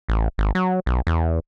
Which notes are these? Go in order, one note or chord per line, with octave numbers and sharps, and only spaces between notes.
A1
G#1
F#3
B1
E2